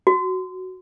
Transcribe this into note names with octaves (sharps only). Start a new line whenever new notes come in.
F#4